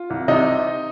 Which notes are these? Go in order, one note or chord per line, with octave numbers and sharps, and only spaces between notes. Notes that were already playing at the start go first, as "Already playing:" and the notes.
Already playing: F4
C2
C3 D#4 D#5